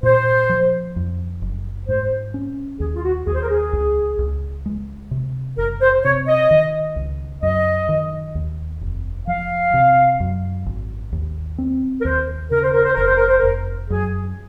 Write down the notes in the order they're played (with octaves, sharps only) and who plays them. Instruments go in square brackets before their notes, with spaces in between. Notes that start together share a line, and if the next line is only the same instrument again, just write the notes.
[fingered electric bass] A#2 [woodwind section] C5
[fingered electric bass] F3
F2
F#1
[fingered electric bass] G#2 [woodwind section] C5
[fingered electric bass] C#4
[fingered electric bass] D#2 [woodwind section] G#4
[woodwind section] F4
F#4
[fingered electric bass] D#2 [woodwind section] G#4
[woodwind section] C5
A#4
G#4
[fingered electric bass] C#2
C#2
G#3
C3
[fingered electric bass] F#1 [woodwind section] A#4
[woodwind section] C5
[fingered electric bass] C3 [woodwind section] C#5
[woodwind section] D#5
[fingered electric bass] D#3
C#2
[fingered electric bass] F#2 [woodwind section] D#5
[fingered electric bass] D#3
D#2
F1
[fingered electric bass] F3 [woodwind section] F5
[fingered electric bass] C3
F#2
G#1
D#2
C4
[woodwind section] A#4
[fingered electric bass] D#2 [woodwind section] C5
[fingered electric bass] C#3 [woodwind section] A#4
[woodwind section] C5
A#4
C5
[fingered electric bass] F1 [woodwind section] A#4
[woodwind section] C5
A#4
C5
[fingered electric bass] F1 [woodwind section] A#4
[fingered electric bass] F#2 [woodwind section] G#4